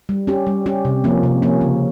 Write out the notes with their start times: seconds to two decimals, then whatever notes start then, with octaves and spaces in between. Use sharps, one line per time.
0.09 G3
0.27 C#4 G4
0.47 G3
0.66 C#4 G4
0.85 C3
1.04 F3 A#3 C#4
1.23 C3
1.42 F3 A#3 C#4
1.61 C#3